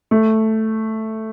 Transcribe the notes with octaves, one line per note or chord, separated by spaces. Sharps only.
A3